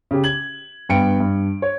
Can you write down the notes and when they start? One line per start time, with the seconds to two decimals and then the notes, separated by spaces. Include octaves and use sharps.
0.11 C#3 G4
0.24 G#6 F#7
0.89 G2 B3 G5 C#7 D7
1.20 G2
1.62 C#5